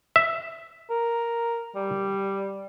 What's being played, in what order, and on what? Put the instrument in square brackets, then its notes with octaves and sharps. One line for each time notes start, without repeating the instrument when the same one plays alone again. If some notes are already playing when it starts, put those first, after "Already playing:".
[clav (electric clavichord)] E5
[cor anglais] A#4
G3